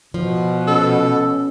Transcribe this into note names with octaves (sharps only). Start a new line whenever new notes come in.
B2 F3
C#4 A4